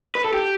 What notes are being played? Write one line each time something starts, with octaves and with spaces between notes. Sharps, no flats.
B4
A4
G4